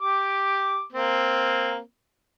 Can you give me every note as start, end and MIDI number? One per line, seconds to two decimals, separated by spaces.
0.01 0.83 67
0.01 0.83 86
0.92 1.79 58
0.92 1.79 60